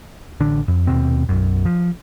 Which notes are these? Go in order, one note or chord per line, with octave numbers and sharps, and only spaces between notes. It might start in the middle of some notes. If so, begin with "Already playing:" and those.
A1 D3 D4
F2
D#1 D#2 B2 C4
B1 F#2
F3